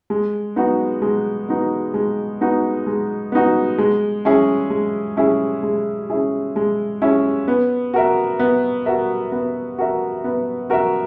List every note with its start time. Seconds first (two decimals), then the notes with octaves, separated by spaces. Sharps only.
0.10 G#3
0.56 B3 D#4 F#4
1.02 G#3
1.49 B3 D#4 F#4
1.94 G#3
2.41 B3 D#4 F#4
2.87 G#3
3.32 B3 D#4 F#4
3.78 G#3
4.25 C#4 E4 G#4
4.70 G#3
5.17 C#4 E4 G#4
5.63 G#3
6.10 C#4 E4 G#4
6.56 G#3
7.02 C#4 E4 G#4
7.48 B3
7.94 F#4 A#4 E5
8.39 B3
8.86 F#4 A#4 E5
9.32 B3
9.78 F#4 A#4 E5
10.24 B3
10.70 F#4 A#4 E5